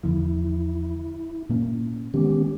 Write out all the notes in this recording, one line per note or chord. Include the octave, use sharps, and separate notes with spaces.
E2 D3 F3 E4
A#2 A#3 C#4
D#3 G#3 A3 B3 C#4 G4